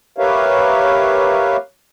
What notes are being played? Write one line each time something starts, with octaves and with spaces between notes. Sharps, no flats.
G4 A#4 B4 C#5 E5 F5